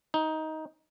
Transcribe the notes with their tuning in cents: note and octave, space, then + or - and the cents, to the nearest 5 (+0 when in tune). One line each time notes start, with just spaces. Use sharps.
D#4 +15